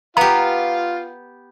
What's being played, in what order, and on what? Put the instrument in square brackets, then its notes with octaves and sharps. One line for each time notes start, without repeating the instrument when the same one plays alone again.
[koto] B3 G4 [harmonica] F4 F5 [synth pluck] A#5